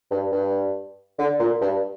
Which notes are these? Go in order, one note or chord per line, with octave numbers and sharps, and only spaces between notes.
G2
G2
D3
A#2
G2